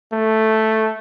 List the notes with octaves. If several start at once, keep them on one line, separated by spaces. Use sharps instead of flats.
A3